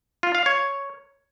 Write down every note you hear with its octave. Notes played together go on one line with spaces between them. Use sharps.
F4
F5
C#5